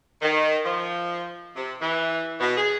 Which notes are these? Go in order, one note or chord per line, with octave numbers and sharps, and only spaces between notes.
D#3
F3
C3
E3
B2
G#4